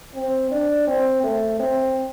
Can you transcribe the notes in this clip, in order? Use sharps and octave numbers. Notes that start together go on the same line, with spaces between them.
C4
D4
C4
A3
C4